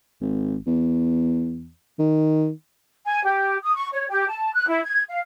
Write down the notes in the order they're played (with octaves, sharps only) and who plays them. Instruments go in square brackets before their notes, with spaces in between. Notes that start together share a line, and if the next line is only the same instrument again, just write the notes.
[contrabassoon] G#1
E2
D#3
[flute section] G#5
G4
D#6
C#6
C#5
G4
A5
F#6
E4
G#6
F5